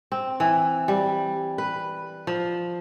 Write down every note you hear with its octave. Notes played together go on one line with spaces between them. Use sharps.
C4
E3
G3
B4
F3